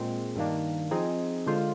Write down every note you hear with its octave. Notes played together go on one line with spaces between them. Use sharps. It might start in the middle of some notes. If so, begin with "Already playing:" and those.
Already playing: A#2 G#3 C4
G2 D#3 A#3 D4
F3 C4 D#4 G#4
D3 G#3 D4 F4 C5